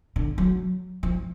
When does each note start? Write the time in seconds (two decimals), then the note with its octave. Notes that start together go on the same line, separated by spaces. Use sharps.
0.16 D3
0.38 F#3
1.03 F3